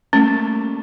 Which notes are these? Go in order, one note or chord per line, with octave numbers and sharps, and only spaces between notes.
G3 A3 A#3 C#4